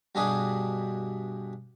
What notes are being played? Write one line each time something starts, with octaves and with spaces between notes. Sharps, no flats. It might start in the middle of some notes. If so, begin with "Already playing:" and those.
G2 B2 D4 G#4